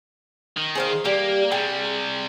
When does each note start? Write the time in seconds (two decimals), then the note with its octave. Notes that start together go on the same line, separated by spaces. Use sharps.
0.57 D#3
0.75 G#4 C5 F5
1.05 G3 A#3 G4
1.52 C3 G3 G#4 G5